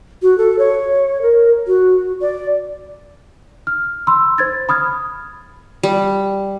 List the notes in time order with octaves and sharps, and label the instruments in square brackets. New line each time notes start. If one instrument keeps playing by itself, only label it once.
[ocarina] F#4
A4
C#5
A#4
F#4
D5
[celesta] F6
B5 C6 E6
C5 G#6 A6
B5 D#6 F6 G#6
[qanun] G3